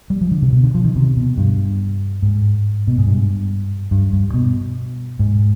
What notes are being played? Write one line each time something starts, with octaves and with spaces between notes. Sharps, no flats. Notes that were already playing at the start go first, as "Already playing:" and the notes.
G3
F3
D3
C3
B2
D3
F3
D#3
C3
B2
G2
G#2
B2
G#2
G2
G2
G2
B2
G#2